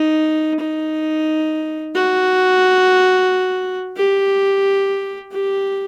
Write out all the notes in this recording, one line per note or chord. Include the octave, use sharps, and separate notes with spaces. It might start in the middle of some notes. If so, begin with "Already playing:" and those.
Already playing: D#4
D#4
F#4
G4
G4